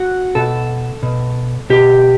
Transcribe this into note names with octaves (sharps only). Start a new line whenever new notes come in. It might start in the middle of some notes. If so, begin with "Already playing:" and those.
Already playing: F#4
B2 A4
B2
B2 G4